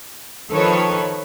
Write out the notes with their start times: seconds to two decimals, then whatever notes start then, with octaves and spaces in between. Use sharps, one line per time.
0.51 D#3 F3 A4 B4 C#5